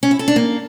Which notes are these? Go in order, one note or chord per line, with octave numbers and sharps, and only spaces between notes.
C#4
E4
A4
D4
A#3